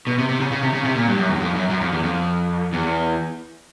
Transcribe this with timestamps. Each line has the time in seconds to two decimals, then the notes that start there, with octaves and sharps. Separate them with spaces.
0.07 B2
0.18 C3
0.29 C3
0.40 C#3
0.52 C#3
0.63 C3
0.73 C#3
0.84 C3
0.95 A#2
1.07 G2
1.17 F#2
1.30 E2
1.36 F#2
1.40 F2
1.55 F#2
1.70 F#2
1.81 F2
1.92 E2
2.03 F2
2.73 E2